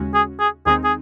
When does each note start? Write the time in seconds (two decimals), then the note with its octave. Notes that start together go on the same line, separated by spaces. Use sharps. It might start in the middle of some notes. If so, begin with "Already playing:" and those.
Already playing: D#2 C#3 G#3 C#4 F#4
0.14 G#4
0.40 G#4
0.66 D#2 D#3 G#3 C4 D#4 G#4
0.84 G#4